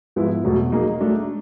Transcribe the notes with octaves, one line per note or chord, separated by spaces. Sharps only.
G#2 F3 G#3 B3 E4
E2 B2 F#3 A3
F#3 A#3 D#4 G#4
F#3 A3 D4